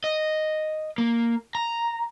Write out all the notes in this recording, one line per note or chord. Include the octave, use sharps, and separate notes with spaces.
D#5
A#3
A#5